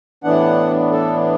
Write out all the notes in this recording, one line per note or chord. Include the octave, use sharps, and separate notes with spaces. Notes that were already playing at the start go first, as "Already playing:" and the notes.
A2 E3 B3 D4 F#5
A4